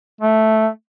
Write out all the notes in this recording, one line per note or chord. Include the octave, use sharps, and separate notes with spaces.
A3